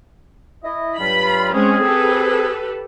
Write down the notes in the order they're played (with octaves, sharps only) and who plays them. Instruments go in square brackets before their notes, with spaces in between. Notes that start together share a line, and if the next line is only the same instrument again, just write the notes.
[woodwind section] E4 D#5
[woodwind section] G2 F#3 F4 [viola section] B5
[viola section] G#3 C#4 [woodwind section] C4 G#4
[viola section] G4 A4 B4